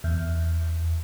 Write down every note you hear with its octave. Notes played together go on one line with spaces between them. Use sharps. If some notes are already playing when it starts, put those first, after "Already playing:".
E2